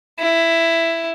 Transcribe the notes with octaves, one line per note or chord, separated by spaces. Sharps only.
E4